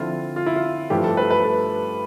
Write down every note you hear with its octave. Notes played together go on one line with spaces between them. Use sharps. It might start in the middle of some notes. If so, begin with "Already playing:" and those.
Already playing: D3 F3 C4 E4 F4
F4
E4
F4
G2 F3 A3 E4 G4
A4
B4
B4
A4